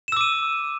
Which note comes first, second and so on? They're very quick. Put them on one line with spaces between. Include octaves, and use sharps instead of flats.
E7 E6 D6 D#7